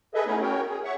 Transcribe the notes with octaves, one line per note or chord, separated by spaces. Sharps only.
G#4 A4 B4 D#5 E5
A3 B3 C#4 D#4 E4 G#4
C#4 F#4 A#4 C#5 G5
G#4
C#5 E5 F#5 C#6